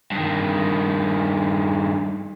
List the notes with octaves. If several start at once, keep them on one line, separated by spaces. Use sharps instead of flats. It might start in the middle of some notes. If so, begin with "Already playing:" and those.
G2 D#3